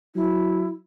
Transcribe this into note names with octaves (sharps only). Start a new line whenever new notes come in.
F#3 E4